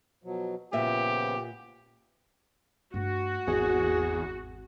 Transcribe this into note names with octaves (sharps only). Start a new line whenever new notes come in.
B2 F3 F#3
A#2 C#3 F3 B3 G4 E5
G2 A3 F#4
G#1 E2 G#4